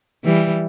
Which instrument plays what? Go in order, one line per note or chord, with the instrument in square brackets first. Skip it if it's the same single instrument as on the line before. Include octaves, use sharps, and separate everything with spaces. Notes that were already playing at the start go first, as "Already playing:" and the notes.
[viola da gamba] E3 G3